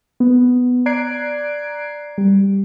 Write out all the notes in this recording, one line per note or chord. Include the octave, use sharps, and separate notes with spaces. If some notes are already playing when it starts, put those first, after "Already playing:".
B3
D5 A#5 F#6 G#6 C7 D7
G3